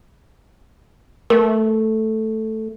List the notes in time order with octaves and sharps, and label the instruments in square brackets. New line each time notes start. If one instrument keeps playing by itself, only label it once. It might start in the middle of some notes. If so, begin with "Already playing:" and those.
[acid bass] A3 [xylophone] A#4